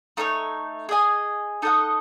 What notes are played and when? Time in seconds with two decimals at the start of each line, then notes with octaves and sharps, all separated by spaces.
0.17 A3 D#4 A4 C#5
0.89 G#4 D#5 G#5
1.62 D#4 A4 D#5 F#5